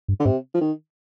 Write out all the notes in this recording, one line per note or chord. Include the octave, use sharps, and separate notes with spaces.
G2
D3
G#2 C3
F3
D#3